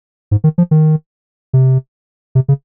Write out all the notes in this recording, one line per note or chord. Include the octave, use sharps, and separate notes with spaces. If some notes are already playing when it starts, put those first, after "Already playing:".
G#2
D#3
F3
D#3
C3
C3
C#3